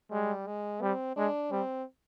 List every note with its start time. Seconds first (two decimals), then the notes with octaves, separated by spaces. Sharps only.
0.11 G3 G#3
0.47 G#3
0.82 G3 C4
1.17 G#3 D4
1.51 G3 C4